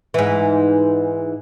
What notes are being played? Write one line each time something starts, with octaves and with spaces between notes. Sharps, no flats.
G#2 E3